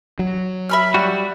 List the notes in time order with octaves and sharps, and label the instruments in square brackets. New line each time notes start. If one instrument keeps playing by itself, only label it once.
[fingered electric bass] F#3
[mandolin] E5 B5 F6
[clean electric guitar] G3 F#4